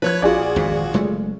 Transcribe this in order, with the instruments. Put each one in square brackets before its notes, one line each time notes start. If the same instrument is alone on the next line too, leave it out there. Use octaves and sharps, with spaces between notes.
[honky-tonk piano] F3 G#6 [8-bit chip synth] B4 C#5 F#6
[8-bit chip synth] A#1 F#4 [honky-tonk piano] F4 G#4 D5
[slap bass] G#1 F2 G#2
F#1 G#3 A3